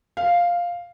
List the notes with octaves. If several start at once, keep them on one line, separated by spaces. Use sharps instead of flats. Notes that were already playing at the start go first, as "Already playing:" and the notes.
F5